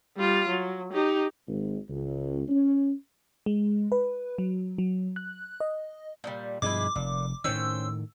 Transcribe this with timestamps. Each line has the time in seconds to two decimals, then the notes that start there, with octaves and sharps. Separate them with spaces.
0.16 G3 F4
0.48 F#3
0.93 D#4 G4
1.47 G#1
1.89 C#2
2.48 C#4
3.46 G#3
3.92 B4
4.38 F#3
4.78 F#3
5.16 F#6
5.60 D#5
6.24 A#2 E3 G3
6.62 G2 B2 F3 G#3 E4 D6
6.96 F1 A#2
7.44 A2 D#3 C#4 C5 G5 E6